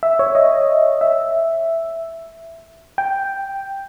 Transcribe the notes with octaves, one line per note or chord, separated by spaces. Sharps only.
E5
C#5
D#5
E5
G5